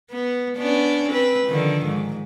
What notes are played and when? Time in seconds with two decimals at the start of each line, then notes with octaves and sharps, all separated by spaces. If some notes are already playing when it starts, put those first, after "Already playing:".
0.11 B3
0.57 B3 C#4 D4
1.09 C4 B4
1.47 D3 D#3 F3
1.86 G#2